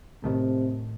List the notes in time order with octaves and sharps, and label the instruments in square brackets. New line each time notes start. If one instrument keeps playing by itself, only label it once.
[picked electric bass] A2 D#3 A3 [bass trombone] C3